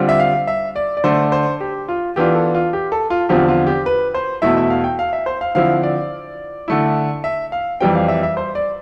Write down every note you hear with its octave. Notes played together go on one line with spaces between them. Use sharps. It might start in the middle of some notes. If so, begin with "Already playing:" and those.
Already playing: D3 G3 C4 F4
E5
F5
E5
D5
D5
D3 A3 D4 C5
C5
G4
F4
E3 B3 D4 F4 G4
A4
F4
G4
A4
F4
E2 D3 F3 C4 F4 G4
F4
G4
B4
C5
E2 B2 A3 E4 E5
E5
F5
G5
F5
E5
C5
F5
D3 F3 C4 E4 F5
D5
D3 A3 E4
E5
F5
F2 E3 G3 C4 G5
F5
E5
E5
C5
D5